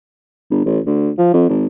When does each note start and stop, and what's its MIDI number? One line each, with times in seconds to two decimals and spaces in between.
0.51 0.62 31
0.65 0.80 33
0.86 1.10 38
1.18 1.31 53
1.34 1.48 41
1.50 1.67 32